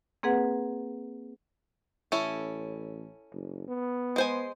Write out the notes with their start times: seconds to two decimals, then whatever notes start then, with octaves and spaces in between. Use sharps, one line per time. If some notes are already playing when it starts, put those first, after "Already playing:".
0.23 A#3 C4 G#4 B4 F#5
2.12 A1 C#4 E4 A4
3.33 F#1
3.68 B3
4.16 G#3 C5 G#5